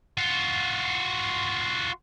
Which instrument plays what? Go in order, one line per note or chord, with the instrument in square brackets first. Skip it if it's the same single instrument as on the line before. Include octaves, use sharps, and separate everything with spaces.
[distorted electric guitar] F4 F#4